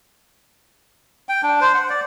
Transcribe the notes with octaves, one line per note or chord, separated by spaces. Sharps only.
G5
D4
C5
F#5
D5